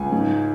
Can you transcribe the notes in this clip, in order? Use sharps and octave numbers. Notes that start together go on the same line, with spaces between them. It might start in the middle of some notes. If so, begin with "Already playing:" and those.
Already playing: C#2 G#5
G#2